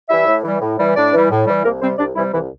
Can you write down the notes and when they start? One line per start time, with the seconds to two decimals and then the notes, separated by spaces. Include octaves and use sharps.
0.09 E3 G3 E4 E5
0.26 A2
0.44 E3 G3
0.61 A2
0.79 E3 G3
0.96 A2 D4 D5
1.13 E3 G3
1.31 A2
1.47 E3 G3
1.64 C2 A#3 A#4
1.81 C3 G3 C4 C5
1.98 C2 D4 D5
2.16 C3 E3 G3 E4
2.33 C2 E3 E4